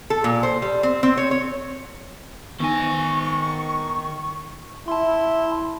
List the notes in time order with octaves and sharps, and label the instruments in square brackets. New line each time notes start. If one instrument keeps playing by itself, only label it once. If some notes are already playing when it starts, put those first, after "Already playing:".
[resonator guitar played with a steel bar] A4
A#2
C5
G3
C4
C4
C#5
C#5
[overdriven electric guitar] D#3 G#5 [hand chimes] B3 D#4 A#6 [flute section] C#6
[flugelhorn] E4 [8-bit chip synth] A5 C6